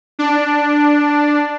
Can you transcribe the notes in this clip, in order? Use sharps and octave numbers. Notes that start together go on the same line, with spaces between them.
D4